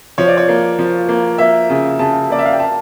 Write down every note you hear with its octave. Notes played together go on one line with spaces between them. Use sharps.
F3 C#5
D5
C#5
A#3
F3
A#3
A#3 E5
C#3
C#3 A5
A#3 D5
E5
F5
G5
A5